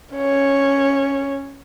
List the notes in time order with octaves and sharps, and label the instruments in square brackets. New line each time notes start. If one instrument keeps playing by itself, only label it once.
[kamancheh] C#4 C#5